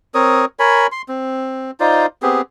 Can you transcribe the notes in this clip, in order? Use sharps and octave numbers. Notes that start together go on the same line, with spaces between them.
C4 A#4 C#5 D#6
A#4 C#5 G#5 B5
C6
C4
D#4 F4 C5 D5
B3 C4 G4 G#4